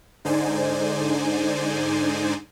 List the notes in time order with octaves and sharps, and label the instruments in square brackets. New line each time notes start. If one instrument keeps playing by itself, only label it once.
[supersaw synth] G#2 D3 D#4 C5 D5 G#5